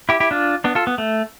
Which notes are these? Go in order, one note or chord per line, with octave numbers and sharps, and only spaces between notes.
E4 G4
E4 G4
D4 F4
B3 D4
F4 A4
B3
A3